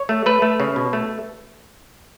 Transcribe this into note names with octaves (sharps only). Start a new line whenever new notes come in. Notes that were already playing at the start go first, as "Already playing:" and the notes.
Already playing: C#5
A3
A3 B4
A3
C#3
B2
A3